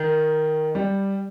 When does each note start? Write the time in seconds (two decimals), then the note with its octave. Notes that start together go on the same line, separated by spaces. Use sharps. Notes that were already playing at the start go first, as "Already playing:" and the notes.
Already playing: D#3
0.75 G3